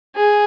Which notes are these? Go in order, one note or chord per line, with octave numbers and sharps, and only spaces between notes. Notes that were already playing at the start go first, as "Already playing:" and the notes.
G#4